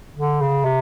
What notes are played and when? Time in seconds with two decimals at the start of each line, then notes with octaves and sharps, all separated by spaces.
0.16 D3
0.41 C#3
0.65 C3